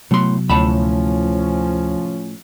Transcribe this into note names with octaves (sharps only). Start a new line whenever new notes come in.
A2 C3 F#3 B3 C6
D2 A2 F3 C#4 A5 B5